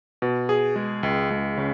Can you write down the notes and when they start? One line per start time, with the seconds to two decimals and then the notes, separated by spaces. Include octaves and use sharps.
0.22 B2
0.49 G#4
0.76 G#3
1.03 C#2
1.30 C#2
1.58 C#3